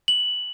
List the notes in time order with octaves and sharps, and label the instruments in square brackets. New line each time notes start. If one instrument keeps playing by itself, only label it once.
[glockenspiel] F#7